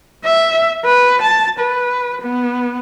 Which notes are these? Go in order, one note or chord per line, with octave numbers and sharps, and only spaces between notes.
E5
B4
A5
B4
B3